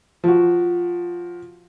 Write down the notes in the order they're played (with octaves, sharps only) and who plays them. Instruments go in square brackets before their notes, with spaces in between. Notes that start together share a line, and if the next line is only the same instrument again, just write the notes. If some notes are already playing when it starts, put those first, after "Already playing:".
[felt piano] F3 F#4